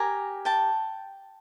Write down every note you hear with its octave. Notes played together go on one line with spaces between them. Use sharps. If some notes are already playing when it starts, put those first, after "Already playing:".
Already playing: G4 A#4 G#5 A#5
G5 A5